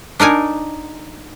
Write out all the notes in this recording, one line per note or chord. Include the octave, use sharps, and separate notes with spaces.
D4 D#4 A#4 G#5